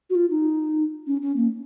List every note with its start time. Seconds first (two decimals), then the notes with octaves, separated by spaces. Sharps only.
0.10 F#4
0.15 F4
0.30 D#4
1.07 C#4
1.22 C#4
1.36 A#3